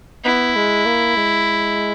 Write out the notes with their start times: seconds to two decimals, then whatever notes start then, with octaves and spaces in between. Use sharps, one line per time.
0.25 B3 E4
0.55 G#3
0.85 A#3
1.16 G#3